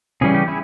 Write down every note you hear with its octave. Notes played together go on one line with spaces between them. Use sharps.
C#3 E3 G3 C#4 G#4
G4
E4 G#4